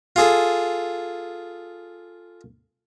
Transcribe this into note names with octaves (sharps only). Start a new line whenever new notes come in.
F4 G#4 A4